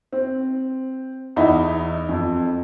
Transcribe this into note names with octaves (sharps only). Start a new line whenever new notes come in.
C4
E2 D#4 E4 B5
F2